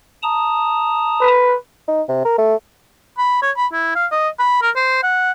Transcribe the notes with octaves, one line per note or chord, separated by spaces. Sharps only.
A5 A#5 D#6
B4
D#4
C3
A#4
A3
B5
C#5
B5
E4
F5
D#5
B5
A#4
C5
F#5